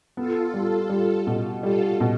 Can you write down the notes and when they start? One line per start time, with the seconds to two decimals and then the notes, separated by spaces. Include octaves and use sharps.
0.16 B3 F4 A4
0.54 G3
0.89 G3
1.27 B2
1.63 G3 F4 A4
2.00 B2